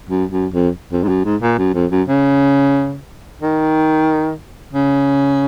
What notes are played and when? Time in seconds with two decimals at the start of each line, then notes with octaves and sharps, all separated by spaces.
0.09 F#2
0.32 F#2
0.54 F2
0.92 F2
1.04 G#2
1.09 F#2
1.25 G#2
1.42 A#2
1.58 F#2
1.75 F2
1.91 F#2
2.08 C#3
3.41 D#3
4.73 C#3